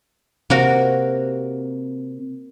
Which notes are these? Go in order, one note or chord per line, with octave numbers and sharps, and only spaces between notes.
C3 A#3 F#4 A#4